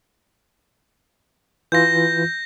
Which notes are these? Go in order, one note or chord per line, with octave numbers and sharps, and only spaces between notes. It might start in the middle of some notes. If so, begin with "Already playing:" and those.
E3 F4 G6 A#6